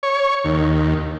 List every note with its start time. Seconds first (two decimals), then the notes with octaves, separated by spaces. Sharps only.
0.03 C#5
0.44 D#2